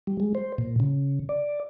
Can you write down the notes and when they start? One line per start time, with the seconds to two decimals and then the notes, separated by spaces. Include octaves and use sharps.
0.07 G3
0.20 G#3
0.35 C5
0.58 A#2
0.80 C#3
1.29 D5